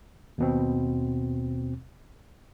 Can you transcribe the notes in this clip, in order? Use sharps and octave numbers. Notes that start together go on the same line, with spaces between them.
D#2 B2 C4